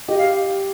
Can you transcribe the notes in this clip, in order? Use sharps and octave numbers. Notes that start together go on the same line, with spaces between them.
G4 D#5
F5